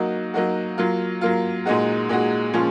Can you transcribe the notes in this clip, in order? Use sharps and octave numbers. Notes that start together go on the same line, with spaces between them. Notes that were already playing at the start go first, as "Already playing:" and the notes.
Already playing: F#3 A#3 D#4 F#4
F#3 A#3 D#4 F#4
F#3 A#3 F4
F#3 A#3 F4
A#2 G#3 D#4 F#4
A#2 G#3 D#4 F#4
A#2 F3 G#3 C#4